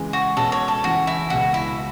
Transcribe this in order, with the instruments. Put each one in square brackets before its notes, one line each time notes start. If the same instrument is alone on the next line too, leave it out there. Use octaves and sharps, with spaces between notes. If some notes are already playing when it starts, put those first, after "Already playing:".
Already playing: [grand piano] C#3 E3 G#3
[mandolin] F#4
[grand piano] B2 G#3 C#4 [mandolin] A4
[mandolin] C#5
A4
[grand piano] E2 C#3 E3 [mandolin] F#4
[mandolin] E4
[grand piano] C#2 B2 G#3 [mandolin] F#4
[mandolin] E4